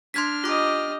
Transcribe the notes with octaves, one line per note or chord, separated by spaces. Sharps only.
D4 C6 F6 G#6 B6
F4 G4 D#5 D6